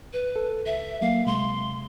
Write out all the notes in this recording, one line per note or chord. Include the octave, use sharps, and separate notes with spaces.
B4
A4
C#2 E5
F#3 A#3 F5
C2 C3 G#3 C6